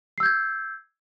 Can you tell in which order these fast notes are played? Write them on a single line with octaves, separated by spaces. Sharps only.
C7 E6 G6 G#6